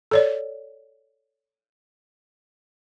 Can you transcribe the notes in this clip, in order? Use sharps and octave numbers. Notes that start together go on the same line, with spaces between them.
A4 C#5 D5